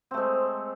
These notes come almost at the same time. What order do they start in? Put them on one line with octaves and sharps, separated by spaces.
C4 A3 G#3